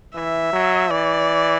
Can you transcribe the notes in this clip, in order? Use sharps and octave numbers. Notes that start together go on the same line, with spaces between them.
E3 E5
F#3
E3 D5